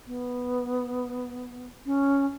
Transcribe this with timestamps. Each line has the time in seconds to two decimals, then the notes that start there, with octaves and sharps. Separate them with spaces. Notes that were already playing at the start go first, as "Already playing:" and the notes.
0.07 B3
1.86 C#4